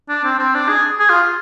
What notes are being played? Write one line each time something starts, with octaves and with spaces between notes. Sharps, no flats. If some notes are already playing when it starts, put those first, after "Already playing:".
D4
C4
C4
D4
G#4
G#4
F4